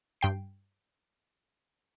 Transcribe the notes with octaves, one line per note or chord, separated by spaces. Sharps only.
G2 G5 C7